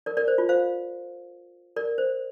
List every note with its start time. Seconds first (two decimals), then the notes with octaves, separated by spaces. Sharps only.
0.06 A#4 D5
0.17 A#4 D5
0.28 C5
0.38 F4
0.49 C5 F5
1.76 A#4 D5
1.98 C5